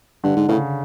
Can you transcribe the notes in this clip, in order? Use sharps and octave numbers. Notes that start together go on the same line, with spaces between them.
G2 D3
G#2
A2 C#3